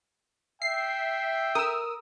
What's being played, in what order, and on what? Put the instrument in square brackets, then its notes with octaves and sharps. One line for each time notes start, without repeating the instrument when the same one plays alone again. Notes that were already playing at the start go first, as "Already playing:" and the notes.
[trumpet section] E5 [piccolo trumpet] G5 [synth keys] C7
[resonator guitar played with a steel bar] A#4 [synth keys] D#6 E6